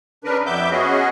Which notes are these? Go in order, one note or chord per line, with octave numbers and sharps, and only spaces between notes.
C#3 D4 A#4 B4
F2 B3 E5 D6 G6
B3 C#4 F#4 G#4 D#5